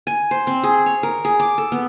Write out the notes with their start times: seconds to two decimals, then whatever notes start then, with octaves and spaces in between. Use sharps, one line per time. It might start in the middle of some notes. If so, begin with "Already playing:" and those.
0.07 G#5
0.31 C5
0.47 C4
0.63 G#4
0.86 C#5
1.03 A#4
1.25 G#4
1.40 D6
1.58 A4
1.72 B3